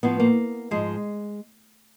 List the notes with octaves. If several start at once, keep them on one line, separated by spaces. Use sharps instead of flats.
A2 F3 B3
A#3
G#2 F3 G#3